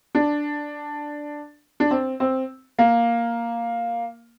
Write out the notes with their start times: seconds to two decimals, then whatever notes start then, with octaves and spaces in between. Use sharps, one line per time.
0.15 D4
1.80 D4
1.91 C4
2.20 C4
2.79 A#3